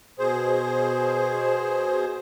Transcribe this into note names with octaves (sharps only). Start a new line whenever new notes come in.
B2 G#4 C5